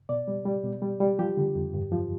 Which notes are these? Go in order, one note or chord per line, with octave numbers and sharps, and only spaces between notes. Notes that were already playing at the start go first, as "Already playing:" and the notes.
B2 D5
G3
G3
B2
G3
G3
F3 G4
D3
F2
G2
F3